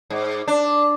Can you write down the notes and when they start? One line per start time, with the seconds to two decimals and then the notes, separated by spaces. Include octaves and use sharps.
0.10 G#2
0.48 D4